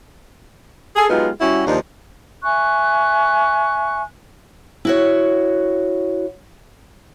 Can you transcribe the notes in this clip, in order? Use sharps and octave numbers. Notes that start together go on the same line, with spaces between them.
G#4 A4
F#3 G#3 B3 D#4 F4 G4
G3 C#4 E4 F#4
D#2 F3 D4 D#4
E5 G#5 C#6 F#6
E4 F#4 C#5